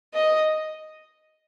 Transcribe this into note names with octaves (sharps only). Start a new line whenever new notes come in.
D#5